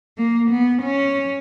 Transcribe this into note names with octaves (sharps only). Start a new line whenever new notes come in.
A#3
B3
C#4